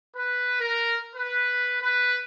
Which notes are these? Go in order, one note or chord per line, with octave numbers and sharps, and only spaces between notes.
B4
A#4
B4
B4